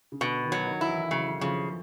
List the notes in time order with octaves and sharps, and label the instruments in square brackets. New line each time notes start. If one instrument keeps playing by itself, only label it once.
[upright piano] C#3
[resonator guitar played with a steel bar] B2 [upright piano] D3
[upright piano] D#3
[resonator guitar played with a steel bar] F#3
[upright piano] D#3
[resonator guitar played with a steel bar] E4
[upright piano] E3
[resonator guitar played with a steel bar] C#3 [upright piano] F#3
[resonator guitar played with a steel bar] C#3 [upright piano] F3